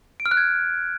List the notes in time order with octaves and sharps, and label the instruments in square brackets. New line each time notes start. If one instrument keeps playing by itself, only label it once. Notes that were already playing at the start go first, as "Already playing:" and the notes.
[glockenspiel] D7
F6
F#6
G#6